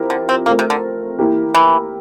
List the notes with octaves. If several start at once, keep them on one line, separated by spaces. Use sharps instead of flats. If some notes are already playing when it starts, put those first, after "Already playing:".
Already playing: F3 C4 E4 G4 A#4
D3
C4
A3 A#3 C4 F4 A#4
C3
D3
E3 A#3 E4 G4 A#4
E3